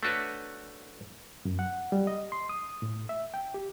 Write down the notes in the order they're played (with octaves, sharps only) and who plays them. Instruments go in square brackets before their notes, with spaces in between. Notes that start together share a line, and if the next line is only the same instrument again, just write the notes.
[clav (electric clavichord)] A3 D4 F#4 B4 C#5
[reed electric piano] F#2
F#5
G3
D#5
C6
D#6
A2
E5
G5
G4